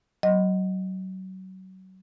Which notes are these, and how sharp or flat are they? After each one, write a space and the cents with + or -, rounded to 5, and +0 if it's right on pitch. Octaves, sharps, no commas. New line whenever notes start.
F#3 +25 D#5 +0